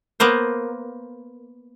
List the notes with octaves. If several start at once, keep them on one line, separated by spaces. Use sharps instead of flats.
A#3 B3 A#4 C5